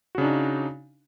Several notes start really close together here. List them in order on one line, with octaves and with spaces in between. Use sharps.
F#4 C#3 D4 D#4